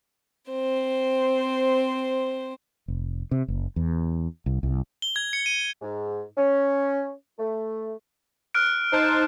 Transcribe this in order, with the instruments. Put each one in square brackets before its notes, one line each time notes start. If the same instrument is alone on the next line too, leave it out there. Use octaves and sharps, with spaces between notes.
[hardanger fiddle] C4 C5
[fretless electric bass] F1
C3
F#1
E2
C2
C2
[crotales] G7
G#6
C#7
D#7
[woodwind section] G#2
C#4
A3
[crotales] F6 F#6 D7
[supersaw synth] D#4 C5 A5